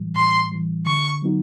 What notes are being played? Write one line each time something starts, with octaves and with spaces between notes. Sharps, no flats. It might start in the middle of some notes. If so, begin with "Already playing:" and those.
Already playing: A2 E3 G3
A2 C6
E3 G3
D3 C#6
F#3 B3 D#4 F#4